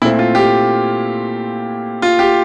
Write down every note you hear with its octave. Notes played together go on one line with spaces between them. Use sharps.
A#2 A3 C4 E4
F4
G4
F4
G4